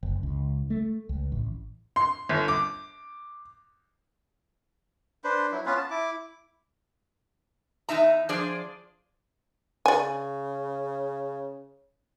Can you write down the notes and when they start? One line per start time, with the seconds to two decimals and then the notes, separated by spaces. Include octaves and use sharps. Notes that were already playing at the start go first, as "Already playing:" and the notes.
0.03 F#1
0.23 C#2
0.70 A3
1.09 C#2
1.32 A1
1.96 C6
2.29 G1
2.48 D6
5.24 D4 B4 C5
5.52 F#3 E4
5.66 B3 C#4 F4 B4
5.77 A5
5.90 E4 D6
7.89 E2 B2 D#4 E5 A#5
8.29 F3 D4 G#4 C5 D5
9.86 C#3 D5 G#5